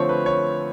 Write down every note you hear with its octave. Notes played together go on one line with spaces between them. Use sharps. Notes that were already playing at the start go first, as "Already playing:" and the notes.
Already playing: D3 F3 A3 C4 C#5
B4
C#5